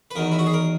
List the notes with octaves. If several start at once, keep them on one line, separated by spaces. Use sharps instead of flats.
B4
E2 D#3 F#3 A#4
E4
F#4
G#4
A#4